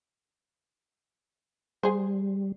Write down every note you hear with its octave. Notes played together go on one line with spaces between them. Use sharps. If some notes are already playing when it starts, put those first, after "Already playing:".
G3 G#4 C5